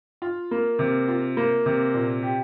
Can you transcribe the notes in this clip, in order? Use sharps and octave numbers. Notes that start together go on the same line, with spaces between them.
F4
A#3
C3
F4
A#3
C3
A#2
G4